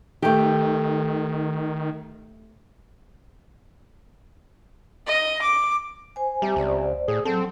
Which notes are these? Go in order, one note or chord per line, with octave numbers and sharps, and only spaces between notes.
D#3 A3 G4
D#5
D6
C5 G#5
C3 G3
C#2 C5 D5
A2 G#4
F#3 C4 A4 A5